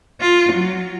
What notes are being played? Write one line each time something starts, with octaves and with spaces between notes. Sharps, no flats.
F4
F#3